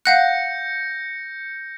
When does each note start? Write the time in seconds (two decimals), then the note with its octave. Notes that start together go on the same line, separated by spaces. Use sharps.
0.05 F5 F#5 F#6 G6 A#6 C#7